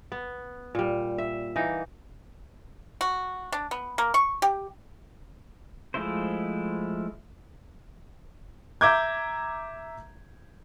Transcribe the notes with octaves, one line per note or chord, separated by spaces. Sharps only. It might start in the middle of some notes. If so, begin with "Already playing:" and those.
B3
A#2 G3
E5
E3 A#3 D#4
F#4
D4
B3
A#3
C#6
G4
F3 G#3 A3 E4 C5
E5 A#5 D6 G6 G#6